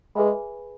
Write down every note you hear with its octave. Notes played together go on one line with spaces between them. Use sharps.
G#3 G#4 B4 E5 G#5 B5